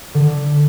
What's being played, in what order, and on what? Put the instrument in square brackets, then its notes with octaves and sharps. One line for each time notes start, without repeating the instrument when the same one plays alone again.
[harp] D3